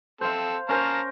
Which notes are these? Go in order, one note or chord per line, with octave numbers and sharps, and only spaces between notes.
C4 A4 C5 F5
C#4 A#4 C5 F5 A5 A#5